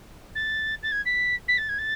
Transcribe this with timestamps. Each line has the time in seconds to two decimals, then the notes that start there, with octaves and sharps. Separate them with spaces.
0.35 A6
0.83 A6
0.92 G#6
1.05 B6
1.48 B6
1.58 A6
1.69 G#6
1.78 A6